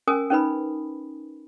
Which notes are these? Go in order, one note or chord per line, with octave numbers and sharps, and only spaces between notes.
C#4 A#4 G#5 D#6
C#4 D#4 B4 B5